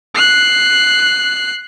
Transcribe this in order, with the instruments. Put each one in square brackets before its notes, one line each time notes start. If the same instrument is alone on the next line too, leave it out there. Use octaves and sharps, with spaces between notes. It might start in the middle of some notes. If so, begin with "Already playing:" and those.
[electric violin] F#6 C7